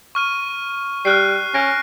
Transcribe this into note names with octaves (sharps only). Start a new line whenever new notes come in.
C#6 F6 D#7
G3 F6 F#6 C7
C#4 A#6 D7